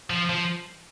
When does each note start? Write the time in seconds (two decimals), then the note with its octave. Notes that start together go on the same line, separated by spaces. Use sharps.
0.10 F3
0.30 F3